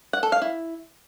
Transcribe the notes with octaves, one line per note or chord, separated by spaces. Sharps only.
F#5
A4
F5
E4